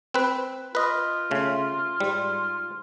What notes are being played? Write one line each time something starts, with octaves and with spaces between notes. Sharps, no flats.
C4 B4
F4 B4 D#5
C#3 A3
G#2 G3